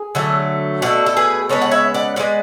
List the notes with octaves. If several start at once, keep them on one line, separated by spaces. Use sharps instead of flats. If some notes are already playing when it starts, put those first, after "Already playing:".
Already playing: G#4
D3 F#3 A3
B2 A3 D4 F#4
A4
G#4 B4
C#3 G#3 B3 A4 C#5
F#5
C#5 E5
D5 F#5
C#3 G#3 B3 D5 F#5